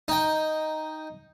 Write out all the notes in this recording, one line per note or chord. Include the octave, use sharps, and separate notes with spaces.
D#4 G5